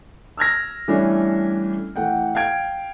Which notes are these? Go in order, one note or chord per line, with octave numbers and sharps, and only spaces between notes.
E6 F6 G#6 A#6
E3 G3 A3 C#4 D4 E4
E3 A3 F#5 G5
F5 G5 G#6 D7